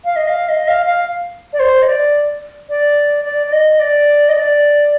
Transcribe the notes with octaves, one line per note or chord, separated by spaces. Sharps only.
F5
D#5
F5
D#5
F5
F5
D5
C5
D#5
D5
D5
D5
D5
D#5
D5
D#5
D5